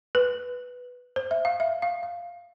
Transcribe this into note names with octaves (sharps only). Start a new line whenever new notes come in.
B4
C5
E5
F5
E5
F5
F5